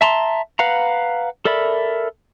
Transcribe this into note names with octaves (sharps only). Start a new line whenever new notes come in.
E5 A5 A#5 C6
B4 F5 F#5 A#5
A4 A#4 D5 E5 B5